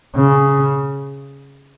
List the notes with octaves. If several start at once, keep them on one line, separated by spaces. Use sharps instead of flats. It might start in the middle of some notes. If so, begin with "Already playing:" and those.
C#3